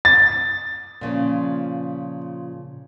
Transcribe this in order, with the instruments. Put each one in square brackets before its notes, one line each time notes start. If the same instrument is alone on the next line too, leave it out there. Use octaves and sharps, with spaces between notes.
[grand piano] A6
[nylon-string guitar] A#2 C#3 F3